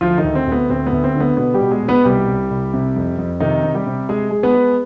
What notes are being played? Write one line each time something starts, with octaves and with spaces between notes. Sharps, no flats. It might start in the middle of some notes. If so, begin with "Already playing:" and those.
D2 F3 F4
D#3 D#4
D2
C4
D2
B3
D2 C4
B3
D2
C4
D3
B3
B2 B3
G3 G4
B2
G#3 G#4
B2
B3 B4
C2 G3 G4
C2
C2
C3
F2
F2
C3 D#3 D#4
C3
G3 G4
C3
G#3 G#4
G#3
B3 B4
G#3